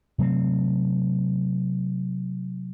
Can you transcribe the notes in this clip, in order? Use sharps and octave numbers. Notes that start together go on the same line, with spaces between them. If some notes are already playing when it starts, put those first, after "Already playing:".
C3 F#3 A3 C4